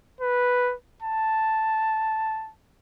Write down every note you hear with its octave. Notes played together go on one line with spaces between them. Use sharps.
B4
A5